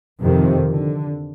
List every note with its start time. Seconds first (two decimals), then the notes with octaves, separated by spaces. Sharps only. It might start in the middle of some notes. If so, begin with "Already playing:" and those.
0.21 F2 C3 D#3
0.70 D3